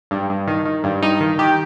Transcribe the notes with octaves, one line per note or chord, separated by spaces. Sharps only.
G2
G2
D#3
D#3
G2
G2 D#4
D#3
D#3 G4